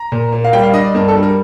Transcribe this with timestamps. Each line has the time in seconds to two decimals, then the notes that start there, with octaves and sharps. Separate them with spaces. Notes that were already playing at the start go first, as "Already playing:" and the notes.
Already playing: A#5
0.12 A#2
0.32 A#3
0.44 F5
0.53 G3 G5
0.63 F5
0.73 D4 D#5
0.85 D5
0.94 G2 A#4
1.08 A4
1.16 G3
1.23 A#4